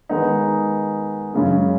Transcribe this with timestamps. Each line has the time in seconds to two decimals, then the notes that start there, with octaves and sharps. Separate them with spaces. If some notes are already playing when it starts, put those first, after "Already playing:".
0.09 D#3 G#3 B3 D#4
1.33 F#2 C#3 G#3